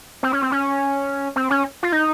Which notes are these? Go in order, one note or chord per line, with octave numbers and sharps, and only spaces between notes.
C4
C#4
C4
C#4
C4
C#4
F4
D#4